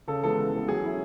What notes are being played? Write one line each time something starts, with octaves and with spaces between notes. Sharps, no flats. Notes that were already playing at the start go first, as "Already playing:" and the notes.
C#3 A4
E3 G#3 B3 A4
C#3
E3 G#3 B3
F#3 G#4
C#4 E4